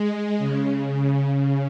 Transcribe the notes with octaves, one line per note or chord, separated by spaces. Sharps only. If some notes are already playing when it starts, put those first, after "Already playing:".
Already playing: G#3
C#3
C#3
C#3